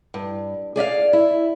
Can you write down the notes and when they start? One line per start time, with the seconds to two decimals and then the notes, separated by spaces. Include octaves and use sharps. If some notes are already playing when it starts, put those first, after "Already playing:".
0.14 G2
0.76 G#4 D5 E5 F5
1.13 E4